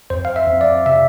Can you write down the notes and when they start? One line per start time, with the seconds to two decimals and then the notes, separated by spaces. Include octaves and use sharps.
0.10 F2 C5
0.25 F5
0.36 E5
0.48 F2
0.61 D5
0.86 C3 E5